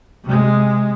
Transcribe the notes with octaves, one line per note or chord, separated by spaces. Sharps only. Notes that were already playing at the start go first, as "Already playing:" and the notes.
C3 G#3